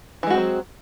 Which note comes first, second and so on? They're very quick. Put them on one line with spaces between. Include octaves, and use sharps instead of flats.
E3 G#3 F#4 C4 F#3